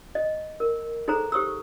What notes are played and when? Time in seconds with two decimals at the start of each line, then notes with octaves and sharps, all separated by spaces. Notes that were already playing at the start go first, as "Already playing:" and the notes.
0.15 D#5
0.60 A#4
1.08 D#4 G#4 A4 C5 A#5
1.32 G4 C5 C#6 D#6 E6